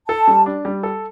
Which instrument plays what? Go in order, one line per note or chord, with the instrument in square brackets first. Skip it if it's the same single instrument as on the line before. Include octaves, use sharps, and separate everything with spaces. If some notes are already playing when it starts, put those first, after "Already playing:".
[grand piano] A4 [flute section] A5
[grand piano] G3
D4
G3
A4